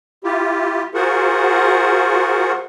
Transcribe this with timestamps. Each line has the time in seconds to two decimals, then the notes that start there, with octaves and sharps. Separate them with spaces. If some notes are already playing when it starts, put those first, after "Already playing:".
0.24 E4 F4 G4
0.94 F4 F#4 G#4 A#4 C5 F#5